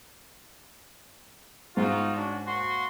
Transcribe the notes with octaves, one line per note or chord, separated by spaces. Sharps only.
G#2 D#4 F4 F#4
C#4 D4 F#4
A#3 F#4 C6